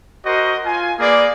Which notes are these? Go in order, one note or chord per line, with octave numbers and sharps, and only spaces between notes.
F#4 A#4 C5 D#5
F4 G#5
A#3 G#4 B4 D5